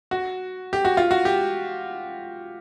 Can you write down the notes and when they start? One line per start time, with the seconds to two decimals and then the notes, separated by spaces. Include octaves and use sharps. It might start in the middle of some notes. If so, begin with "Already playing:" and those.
0.11 F#4
0.73 G4
0.85 F#4
0.97 F4
1.11 F#4
1.25 G4